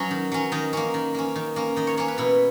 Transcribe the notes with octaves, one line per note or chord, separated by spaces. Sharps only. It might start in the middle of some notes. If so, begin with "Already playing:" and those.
Already playing: F#3 C#4 D#5
D#3
F#3 C#4
D#3 D#5
A#3 C#4
D#3
A#3 C#4
D#3
A#3 C#4
D#3 D#5
C#5
A#3 C#4 C#5
B4
B2 E4